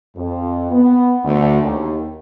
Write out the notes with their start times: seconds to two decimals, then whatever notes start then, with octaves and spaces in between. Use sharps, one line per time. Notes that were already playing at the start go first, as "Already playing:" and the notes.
0.16 F2
0.71 B3
1.24 D2
1.62 D#2